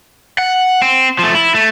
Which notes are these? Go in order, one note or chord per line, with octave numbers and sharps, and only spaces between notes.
F#5
C4
F3 A3
E4
A3